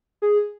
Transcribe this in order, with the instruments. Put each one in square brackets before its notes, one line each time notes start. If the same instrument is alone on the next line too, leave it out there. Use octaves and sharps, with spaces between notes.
[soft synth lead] G#4